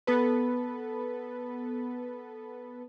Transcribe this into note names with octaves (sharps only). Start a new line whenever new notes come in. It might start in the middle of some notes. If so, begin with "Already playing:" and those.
B3 A4 B4